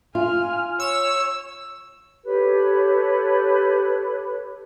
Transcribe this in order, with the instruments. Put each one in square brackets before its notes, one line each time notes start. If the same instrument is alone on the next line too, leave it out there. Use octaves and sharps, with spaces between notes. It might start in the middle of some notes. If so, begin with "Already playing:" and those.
[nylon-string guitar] F4 [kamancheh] G#5 F6
[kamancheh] C#5 [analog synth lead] E6
[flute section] G4 A4 B4 C#5